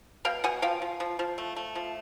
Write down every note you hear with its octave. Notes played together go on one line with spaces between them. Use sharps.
B2 F5 G5
B2 F#5 G#5
F3 F5 G5
F3
F3
F3
A3
A3
F3